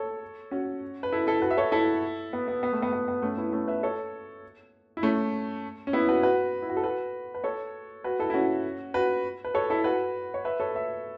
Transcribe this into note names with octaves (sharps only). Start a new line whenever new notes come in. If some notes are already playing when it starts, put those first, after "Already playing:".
Already playing: A4 C#5
C#4 F#4
B4
E4 A4
E4 A4
F#4 B4
E5
A4 C#5
E4 A4
B3
B3
B3
A3
B3
B3
B3
A3 C#4
B3 E4
A3 C#4
B4 E5
A4 C#5
E4
A3 C#4
C#4
B3 E4
F#4 B4
F#4 B4
E4
F#4
A4
F#4 B4
B4
A4 C#5
F#4 B4
E4 A4
E4
C#4 F#4
F#4 B4
B4
A4 C#5
E4 A4
F#4 B4
C#5
B4 E5
A4 C#5
B4 E5